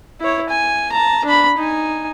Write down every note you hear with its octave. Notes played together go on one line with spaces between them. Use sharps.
E4 C#5
G#5
A5 A#5
D4 B5
D#4 G#5